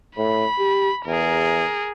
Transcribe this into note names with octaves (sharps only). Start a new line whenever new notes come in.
A2 B5
G4
E2 G#4 A#4